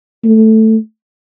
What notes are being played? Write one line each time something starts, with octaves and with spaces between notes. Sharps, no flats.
A3